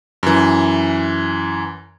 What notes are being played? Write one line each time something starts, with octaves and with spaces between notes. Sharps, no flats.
F#2 E3